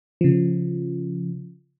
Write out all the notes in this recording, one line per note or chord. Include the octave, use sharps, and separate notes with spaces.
C#3 F3